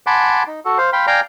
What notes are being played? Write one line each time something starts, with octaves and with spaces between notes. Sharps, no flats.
F#5 G#5 A5 B5 C6 D6
D#4
F#4 A4
C5 F5
F5 G5 B5 C6
D5 F5 G5 G#5 A#5 D6